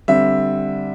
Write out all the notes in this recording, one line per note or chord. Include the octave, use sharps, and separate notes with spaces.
D3 G3 C4 E5